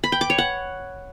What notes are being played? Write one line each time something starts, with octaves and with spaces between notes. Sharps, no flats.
B5
G5
D6
C#5
F#5